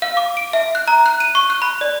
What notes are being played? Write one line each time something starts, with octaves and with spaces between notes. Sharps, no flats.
F5
D6
D7
E5
F#6
A#5
F#6
D#7
C#6
F#6
B5
D5